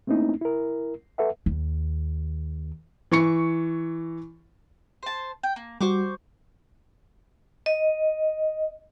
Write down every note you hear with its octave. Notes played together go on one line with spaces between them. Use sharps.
A3 A#3 C4 C#4 D#4 E4
E4 A#4
A4 B4 E5 F#5
D#2
E3 C#6 C#7
C5 A5
G5
A#3
G3 F#4 C5 C#6 D6
D#5